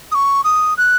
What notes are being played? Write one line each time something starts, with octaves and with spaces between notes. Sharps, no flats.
D#6
C#6
D#6
F#6